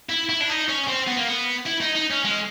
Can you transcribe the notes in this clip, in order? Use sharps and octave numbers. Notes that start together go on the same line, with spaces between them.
E4
E4
D4
D#4
C#4
C4
B3
A#3
B3
E4
D#4
D#4
C#4
G#3